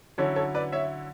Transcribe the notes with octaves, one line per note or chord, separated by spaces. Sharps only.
D3 F#3 C#4 E4 A4 C#5
A4 C#5
B4 D5
C#5 E5